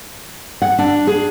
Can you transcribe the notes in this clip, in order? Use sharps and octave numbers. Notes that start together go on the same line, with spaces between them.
F#5
D4
G#4